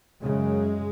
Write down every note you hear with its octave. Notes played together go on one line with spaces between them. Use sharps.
F#2 C#3 G#3